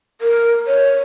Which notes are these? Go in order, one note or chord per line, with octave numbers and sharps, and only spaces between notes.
A#4
C#5